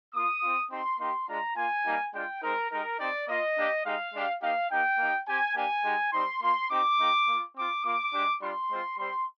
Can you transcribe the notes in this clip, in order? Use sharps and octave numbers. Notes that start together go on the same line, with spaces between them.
A#3 F4 D#6
C4 F4
C4 D#4 G4 C6
A#3 D#4 G4 C6
G#3 D4 F4 A#5
A#3 F4 G#5
G3 A#3 D#4 G4
G#3 D4 F4 G5
G#3 C4 D#4 A#4
G#3 D#4 G4 A#4
C4 D#4 G4 D5
A#3 F4 D#5
A#3 D4 G4
G#3 D#4 G4 F5
G#3 D4 G4
A#3 D#4 G4 F5
A#3 D#4 G4 G5
A#3 D#4 G4
C4 G4 G#5
A#3 D4 G4 G#5
G#3 D#4 G4
G3 C4 D#4 C6
A#3 F4 C6
C4 D#4 G4 D6
A#3 D#4 G4
A#3 F4
C4 F4 D6
A#3 F4 D6
G#3 D4 G4
G3 D4 F4 C6
G#3 C4 F4
G3 C4 G4 C6